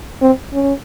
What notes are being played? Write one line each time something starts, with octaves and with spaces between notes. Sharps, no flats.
C4
C#4